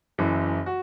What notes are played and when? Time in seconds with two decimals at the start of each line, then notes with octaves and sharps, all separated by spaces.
0.18 F#1 F#2 E3
0.66 F#4